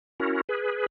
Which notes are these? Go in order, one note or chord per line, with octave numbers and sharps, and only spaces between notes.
C#4 E4 F#4 A#4
G#4 B4